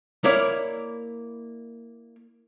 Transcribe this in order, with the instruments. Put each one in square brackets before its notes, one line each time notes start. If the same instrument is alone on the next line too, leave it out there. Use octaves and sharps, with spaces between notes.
[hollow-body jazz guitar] A#3 E4 C#5 D5 F5